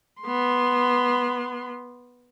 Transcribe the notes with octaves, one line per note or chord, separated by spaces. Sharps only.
B3 C6